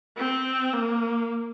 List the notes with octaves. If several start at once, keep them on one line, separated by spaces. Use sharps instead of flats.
C4
A#3